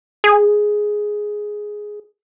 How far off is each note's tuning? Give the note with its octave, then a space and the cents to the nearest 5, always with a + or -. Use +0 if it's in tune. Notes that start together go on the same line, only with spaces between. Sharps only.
G#4 +5